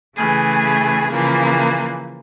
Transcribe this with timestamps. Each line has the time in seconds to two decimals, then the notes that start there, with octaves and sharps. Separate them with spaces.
0.17 C#3 E3 A3 G#4
1.09 C#3 E3 F3 A#3